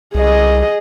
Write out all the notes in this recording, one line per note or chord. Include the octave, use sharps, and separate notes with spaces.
C2 G#4 D#5